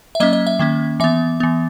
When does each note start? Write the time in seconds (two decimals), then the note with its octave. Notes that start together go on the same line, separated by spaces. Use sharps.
0.15 E5
0.20 F#3 A#3 C#4 D#5
0.33 D#5
0.47 E5
0.59 D#3 A#3 C#4
1.00 E3 B3 E5
1.40 E3 B3